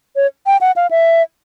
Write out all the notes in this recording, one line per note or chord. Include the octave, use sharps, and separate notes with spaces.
C#5
G5
F#5
F5
E5